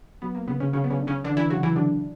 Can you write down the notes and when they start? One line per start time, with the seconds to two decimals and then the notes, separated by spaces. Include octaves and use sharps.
0.22 F#3 B3
0.35 A#3
0.48 C#3 B3
0.60 C#3 C#4
0.73 C#3 F#3 C#4
0.84 B3
0.90 C#3 C#4
0.99 D3
1.07 C#3 C#4
1.24 D3 E3 D4
1.37 E3 E4
1.50 C#3 F#3 F#4
1.63 E3 E4
1.76 D3 F#3 D4